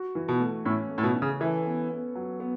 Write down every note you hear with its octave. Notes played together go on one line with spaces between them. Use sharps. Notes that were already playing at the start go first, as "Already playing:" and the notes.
Already playing: F#4
E3
B2
A3
A2 C#4
A3
A2
B2
C#4
C#3
E3 A4
B3
B3
F#3
B3